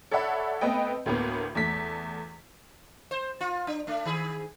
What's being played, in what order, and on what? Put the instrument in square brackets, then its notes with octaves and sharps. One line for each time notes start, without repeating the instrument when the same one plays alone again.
[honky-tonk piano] A4 C#5 D5 E5 F#5 B5
A3 B3 C4 B4 D#5 G5
D2 A2 A#3 B3
E2 A3 B6
[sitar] C5
F4
D4
A3 D4
D#3 G#4